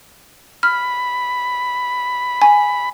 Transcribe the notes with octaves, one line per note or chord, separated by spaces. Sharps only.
B5 F6
G#5